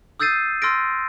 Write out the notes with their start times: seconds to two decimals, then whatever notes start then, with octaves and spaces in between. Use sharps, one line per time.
0.20 D#6 E6 G6 A6 C7 D#7
0.62 C6 E6 F6 A6 A#6 D7